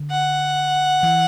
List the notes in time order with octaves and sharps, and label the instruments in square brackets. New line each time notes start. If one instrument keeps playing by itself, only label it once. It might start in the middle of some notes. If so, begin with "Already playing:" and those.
Already playing: [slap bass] D3
[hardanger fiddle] F#5
[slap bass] E3